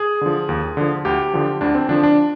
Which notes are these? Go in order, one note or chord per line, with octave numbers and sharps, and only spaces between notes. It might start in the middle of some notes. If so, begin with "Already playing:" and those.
Already playing: G#4
D3 F3
D#2
D3 F3
D2 G4
D3 F3
D2 D4
C4
D3 F3 D4
D4